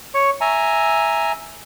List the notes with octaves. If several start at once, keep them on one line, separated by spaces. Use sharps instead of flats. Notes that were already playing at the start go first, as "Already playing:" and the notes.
C#5 C#6
E5 G#5 A#5